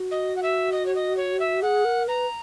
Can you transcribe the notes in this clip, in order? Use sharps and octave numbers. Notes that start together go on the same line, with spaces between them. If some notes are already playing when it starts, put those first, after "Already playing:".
Already playing: F#4
D#5
F#5
E5
D#5
C#5
D#5
C#5
E5
G#4 F#5
A#4
B4 A#5